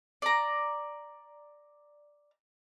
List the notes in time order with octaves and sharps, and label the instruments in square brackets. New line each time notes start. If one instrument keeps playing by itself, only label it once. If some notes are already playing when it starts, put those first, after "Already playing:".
[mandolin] D5 A#5